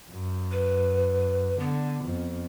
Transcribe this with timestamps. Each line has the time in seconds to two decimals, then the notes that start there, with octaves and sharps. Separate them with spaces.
0.11 F#2
0.52 B4
1.60 D3 B3
2.04 F2